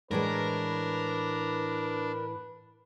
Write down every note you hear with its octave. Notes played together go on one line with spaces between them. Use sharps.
A2 E3 G#3 D4 A#4 B4